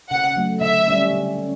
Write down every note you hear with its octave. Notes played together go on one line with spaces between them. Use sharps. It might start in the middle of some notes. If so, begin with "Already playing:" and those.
C#3 F#5
F#3 A3
D3 E5
G3 C#4
D3
C#4